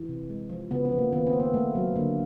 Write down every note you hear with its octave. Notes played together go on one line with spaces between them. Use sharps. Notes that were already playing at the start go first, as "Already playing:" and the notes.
Already playing: E3
C3
G#3
F3
C#3 B3
B3
F3
A#3
D#3 B3
C4
A#3
B3
A3 A#3
F#3
D3 A#3